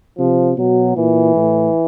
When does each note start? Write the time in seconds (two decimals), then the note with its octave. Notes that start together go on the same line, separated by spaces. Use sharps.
0.18 C3 F3
0.57 B2 F#3
0.96 A#2 E3
1.35 A2